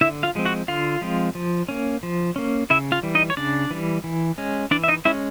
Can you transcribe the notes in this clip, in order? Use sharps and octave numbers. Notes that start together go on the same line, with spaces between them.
D3 E4 E5
F4 F5
F3 G#3 C4
F#4 F#5
D3 F4 F5
F3 G#3 C4
F3
A#3 C#4
F3
A#3 C#4
C#3 E4 E5
F4 F5
E3 G3
D#4 D#5
C#5
C#3 D4 D5
E3 G3
E3
G#3 C#4
E3 D4 D5
E5
D#4 D#5
G#3 C#4 E4 E5